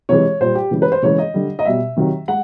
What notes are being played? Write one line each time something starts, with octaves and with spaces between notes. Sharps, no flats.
C3 E3 G#3 C#5
A#2 G3 C5
G4
C#3 E3 G#3
B4
C5
C#3 E3 G#3 C#5
D#5
D3 G3
D#5
B2 G3 E5
C3 D#3 F#3
G#3 F#5